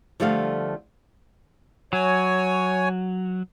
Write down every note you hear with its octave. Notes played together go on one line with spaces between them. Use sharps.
D3 F3 G3 A3 F4 F5
F#3 C#5 G#5